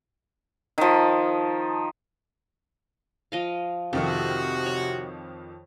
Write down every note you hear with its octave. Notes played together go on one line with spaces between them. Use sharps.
D#3 F3
F3 D#5 F5
F2 C3 D#3 F3 F#4 A4
C#5